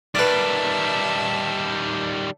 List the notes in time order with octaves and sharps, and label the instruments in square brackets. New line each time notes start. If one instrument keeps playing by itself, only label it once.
[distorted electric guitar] D#3 G3 [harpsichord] B4 D5 [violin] E5 A5